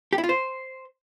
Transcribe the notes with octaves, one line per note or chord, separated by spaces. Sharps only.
G4
E4
F4
C5